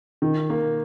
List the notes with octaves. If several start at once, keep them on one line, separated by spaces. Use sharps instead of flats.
D#3
A#3